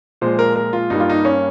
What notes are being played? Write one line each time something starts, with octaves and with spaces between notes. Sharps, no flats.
A#2 F3 G#3 C5
A#4
A#4
F4
G2 G3 A#3 D#4
F4
D#4
C#4